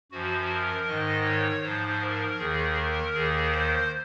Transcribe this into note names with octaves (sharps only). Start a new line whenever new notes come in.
F#2 F3 F#4
A#4
G#2 D#3 D#5
C#5
G#2 F3 C5
A#4
D#2 D#3 G#4
A#4
D#2 D#3 G#4
C5